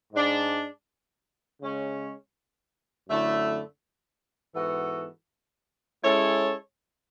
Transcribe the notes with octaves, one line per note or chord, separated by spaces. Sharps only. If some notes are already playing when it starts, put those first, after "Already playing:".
G#2 G#3 D4
C#3 G#3 C#4
F#2 D3 A3 E4
G#2 E3 B3 F#4 A4
G#3 C#4 E4 A4 C#5